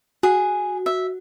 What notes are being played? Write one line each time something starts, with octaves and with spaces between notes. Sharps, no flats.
F#4 G#4
E5